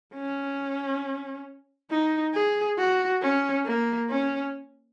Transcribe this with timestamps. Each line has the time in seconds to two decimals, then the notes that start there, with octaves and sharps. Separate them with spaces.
0.14 C#4
1.91 D#4
2.34 G#4
2.78 F#4
3.22 C#4
3.66 A#3
4.10 C#4